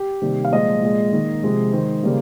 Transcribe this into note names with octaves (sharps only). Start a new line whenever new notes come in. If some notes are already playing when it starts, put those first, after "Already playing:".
Already playing: G4
C3 D#3 G3 A#3
F5
A#2 F3 G#3 D#5
A#2 G#3
D#3 A#3
C3 F3 G#3
D#3 G#3 C5
C#3 G3 A#3